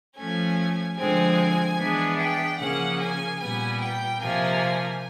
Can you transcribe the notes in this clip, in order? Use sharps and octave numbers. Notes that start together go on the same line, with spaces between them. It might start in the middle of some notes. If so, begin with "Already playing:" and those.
F3 A3 C#4 G#5
D3 F3 G#3 C4 G#5
E3 G#3 B3 D4
G5
C#3 F3 A#3 C#4 F#5
G#5
A#2 G3 B3 G#5
G5
C3 F3 A#3 G#5